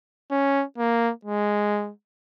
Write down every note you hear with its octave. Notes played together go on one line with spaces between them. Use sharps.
C#4
A#3
G#3